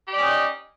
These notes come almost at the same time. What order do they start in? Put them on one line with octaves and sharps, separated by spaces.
G4 D5 C#4 D#4 D#5